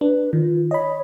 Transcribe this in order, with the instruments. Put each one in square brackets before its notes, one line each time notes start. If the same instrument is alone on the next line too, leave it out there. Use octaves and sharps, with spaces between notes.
[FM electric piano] D4 [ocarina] B4
[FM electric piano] D#3 [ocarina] F4
[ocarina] C#5 [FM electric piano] D#5 B5